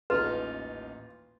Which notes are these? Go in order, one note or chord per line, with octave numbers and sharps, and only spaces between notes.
D#1 A1 D#4 F4 B4